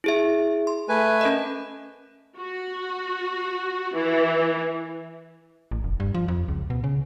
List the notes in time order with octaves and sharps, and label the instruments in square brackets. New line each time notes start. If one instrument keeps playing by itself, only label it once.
[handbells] E4 G#4 E5
C6
[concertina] A3 B4 G#5
[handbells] C#4 A#4 D#5
[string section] F#4
E3
[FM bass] A1
F1
G2
F3
F2
C#2
B2
C#3